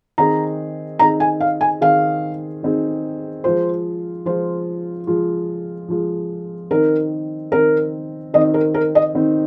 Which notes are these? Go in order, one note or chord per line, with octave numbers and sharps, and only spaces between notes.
D#3 C4 D#4 G#4 A#5
D#3 C4 D#4 G#4 A#5
G#5
F5
G#5
D#3 C4 D#4 G#4 F5
D#3 C4 D#4 G#4
F3 G#3 F4 C5
F3 G#3 F4 C5
F3 G#3 F4
F3 G#3 F4
D#3 C4 D#4 A#4
D#3 C4 D#4 A#4
D#3 C4 D#4 D#5
A#4
A#4
D#5
D#3 C4 D#4